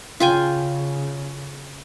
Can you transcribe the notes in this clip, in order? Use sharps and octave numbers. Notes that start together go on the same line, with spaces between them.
C#3 F4 G5 G#5